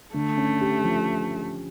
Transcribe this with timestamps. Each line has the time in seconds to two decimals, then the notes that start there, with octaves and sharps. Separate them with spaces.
0.14 D3 A3
0.38 C#4
0.61 G4
0.84 F3